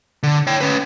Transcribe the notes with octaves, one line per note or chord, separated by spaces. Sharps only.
D3
C#5 G5
C#4 B4